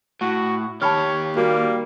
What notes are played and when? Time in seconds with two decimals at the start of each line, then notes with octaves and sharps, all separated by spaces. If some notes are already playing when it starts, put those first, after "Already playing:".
0.21 A2 F#4
0.82 D#3 G4 C#5 A5 B5 F6
1.36 G3 A#3 F#4